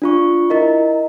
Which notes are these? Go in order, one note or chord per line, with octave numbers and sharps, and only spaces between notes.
D4 F4 C#6
E4 A#4 D#5